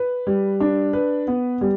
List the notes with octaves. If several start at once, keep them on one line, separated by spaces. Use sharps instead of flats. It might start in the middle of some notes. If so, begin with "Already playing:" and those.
Already playing: B4
G3
D4
B4
B3
G3